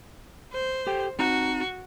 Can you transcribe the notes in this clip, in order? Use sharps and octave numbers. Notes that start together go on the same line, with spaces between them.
C5
G4 A4 G5
C4 D#4 F#4 A#5